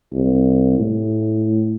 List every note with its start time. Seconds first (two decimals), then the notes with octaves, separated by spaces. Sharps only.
0.13 C2
0.80 A2